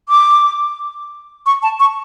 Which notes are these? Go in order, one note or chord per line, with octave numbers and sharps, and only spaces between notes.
D6
C#6
A5
C#6